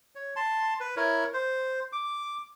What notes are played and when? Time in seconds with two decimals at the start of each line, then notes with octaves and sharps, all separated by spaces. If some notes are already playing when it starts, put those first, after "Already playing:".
0.15 C#5
0.36 A5 C6
0.80 B4
0.96 E4 A#4 C#5
1.34 C5
1.93 D6